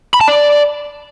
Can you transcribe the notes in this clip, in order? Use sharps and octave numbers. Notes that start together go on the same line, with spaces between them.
B5
A5
D5